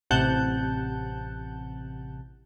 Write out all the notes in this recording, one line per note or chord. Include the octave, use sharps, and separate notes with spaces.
A1 C3 F#5 A5 F#6 G6